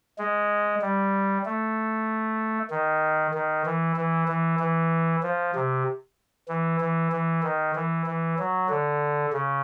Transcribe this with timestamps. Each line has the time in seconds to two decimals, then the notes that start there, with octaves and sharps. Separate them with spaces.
0.19 G#3
0.82 G3
1.45 A3
2.70 D#3
3.34 D#3
3.66 E3
3.96 E3
4.28 E3
4.59 E3
5.23 F3
5.55 C3
6.48 E3
6.80 E3
7.12 E3
7.43 D#3
7.76 E3
8.06 E3
8.39 F#3
8.69 D3
9.33 C#3